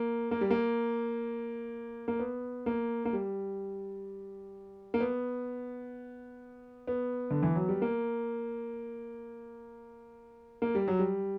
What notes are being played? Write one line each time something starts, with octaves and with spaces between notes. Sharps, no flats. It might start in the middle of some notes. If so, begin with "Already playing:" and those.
Already playing: A#3
A#3
G3
A#3
A#3
B3
A#3
A#3
G3
A#3
B3
B3
D3
E3
F#3
G3
A#3
A#3
G3
F#3
G3